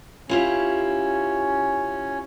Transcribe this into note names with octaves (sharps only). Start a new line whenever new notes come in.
C#4 E4 F4 G4